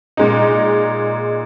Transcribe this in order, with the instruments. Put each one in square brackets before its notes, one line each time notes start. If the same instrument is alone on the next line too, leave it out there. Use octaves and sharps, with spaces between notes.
[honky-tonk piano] A#2 G#3 D#4